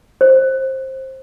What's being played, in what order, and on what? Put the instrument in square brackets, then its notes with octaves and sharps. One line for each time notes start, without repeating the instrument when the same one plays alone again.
[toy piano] C5